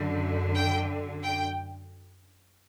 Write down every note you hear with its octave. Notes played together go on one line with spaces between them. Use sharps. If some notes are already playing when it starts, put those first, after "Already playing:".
Already playing: F#2 D3
G5
G5